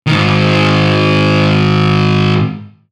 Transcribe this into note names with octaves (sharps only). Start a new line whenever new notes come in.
G#2 D#3